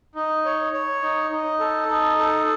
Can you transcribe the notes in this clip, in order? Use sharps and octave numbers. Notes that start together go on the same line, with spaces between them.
D#4
C#5
C#5
D#4
D#4
A4
D#4
A4